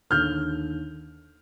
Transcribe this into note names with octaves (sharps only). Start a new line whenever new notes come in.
D#2 D3 F6 G6